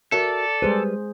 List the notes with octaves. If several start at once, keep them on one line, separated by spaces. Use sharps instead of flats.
F#4 A4 A#4 D5 E5
G3 G#3 G#4 B4 C5